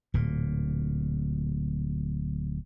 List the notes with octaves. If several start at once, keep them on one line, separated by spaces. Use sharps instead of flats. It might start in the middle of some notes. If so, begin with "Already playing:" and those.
D1 A#2